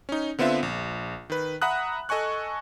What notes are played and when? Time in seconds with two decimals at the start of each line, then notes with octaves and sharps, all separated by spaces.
0.09 C#4 D#4
0.38 D3 B3 C4 F4 E5
0.63 A#1
1.30 D#3 B4
1.62 E5 F#5 A#5 B5 D#6 F#6
2.09 A4 D#5 G#5 C#6 F#6